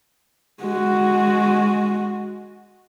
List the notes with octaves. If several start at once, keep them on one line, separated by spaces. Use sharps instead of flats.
G#3 F#4